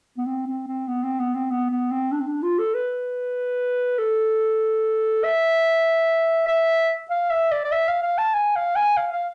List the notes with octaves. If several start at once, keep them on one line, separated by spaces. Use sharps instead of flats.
B3
C4
C4
C4
B3
C4
B3
C4
B3
B3
C4
D4
C4
D4
F4
A4
B4
A4
E5
E5
F5
E5
D5
D5
E5
F5
F5
A5
G#5
F5
G#5
F5
F5